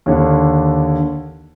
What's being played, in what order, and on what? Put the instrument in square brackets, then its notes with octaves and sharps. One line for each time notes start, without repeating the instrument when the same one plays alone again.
[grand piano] D#2 D3